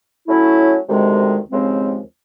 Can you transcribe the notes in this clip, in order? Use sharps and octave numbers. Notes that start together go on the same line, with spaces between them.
F#3 A3 C#4 E4
D2 C3 D#3 G#3
D#2 C#3 F3 G#3 C4